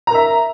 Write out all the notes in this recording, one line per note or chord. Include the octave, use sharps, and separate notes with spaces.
A#4 E5 A#5